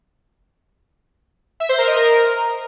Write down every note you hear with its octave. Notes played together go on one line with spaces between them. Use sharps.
E5
C5
A#4
D#5
A#4